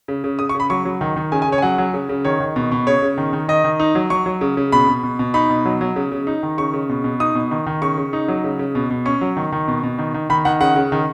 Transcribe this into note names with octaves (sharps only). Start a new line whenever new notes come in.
C#3
C#3
C#3 D#6
C#6
C#3
B5
F#3 C#6
F#3
D#3
D#3
C#3 G#5
G#5
C#3 C#5
G#5
F#3 F#5
F#3
C#3
C#3
D#3 C#5
D#3
B2
B2
C#3 C#5
C#3
D#3
D#3
D#3 D#5
D#3
D#4
F#3
F#3 C#6
F#3
C#3
C#3
B2 B5
B2
B2
B2
D#4 B5
B2
F#3
F#3
C#3
C#3
D#4
D#3
C#3 C#6
C#3
B2
B2
D#4 D#6
B2
D#3
D#3
C#3 C#6
C#3
D#4
F#3
C#3
C#3
B2
B2
C#4 C#6
F#3
D#3
D#3
B2
B2
D#3
D#3
D#3 B5
D#3 F#5
C#3 F#5
C#3
D#3